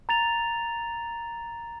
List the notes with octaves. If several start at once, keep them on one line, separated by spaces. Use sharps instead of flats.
A#5 A6 F7